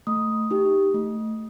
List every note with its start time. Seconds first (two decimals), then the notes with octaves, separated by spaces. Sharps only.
0.07 A3 D#6
0.51 D#4 G4
0.94 A3